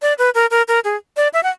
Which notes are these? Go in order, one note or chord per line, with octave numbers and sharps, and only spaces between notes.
D5
B4
A#4
A#4
A#4
G#4
D5
E5
F#5